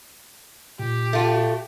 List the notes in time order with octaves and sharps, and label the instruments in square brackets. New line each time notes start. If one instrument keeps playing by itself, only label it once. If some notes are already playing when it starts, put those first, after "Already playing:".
[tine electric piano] A#2 [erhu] G4
[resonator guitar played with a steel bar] A3 F4